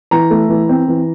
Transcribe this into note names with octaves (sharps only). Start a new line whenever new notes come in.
E3 A#5
A3
E3
C4
E3